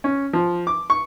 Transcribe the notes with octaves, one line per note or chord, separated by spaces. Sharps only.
C#4
F3
D6
C#6